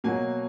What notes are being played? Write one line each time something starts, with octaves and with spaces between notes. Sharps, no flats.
B2 F#3 A#3 G#5